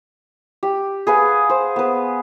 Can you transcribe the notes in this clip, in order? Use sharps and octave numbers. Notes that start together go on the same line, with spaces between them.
G4
G#4 B4 F5 F#5
C5
B3 B4